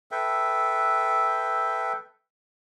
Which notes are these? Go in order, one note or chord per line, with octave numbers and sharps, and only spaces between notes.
A4 B4 E5 G5